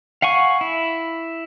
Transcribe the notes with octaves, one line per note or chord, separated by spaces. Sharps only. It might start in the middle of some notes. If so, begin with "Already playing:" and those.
F5 F#5 G#5 C#6
E4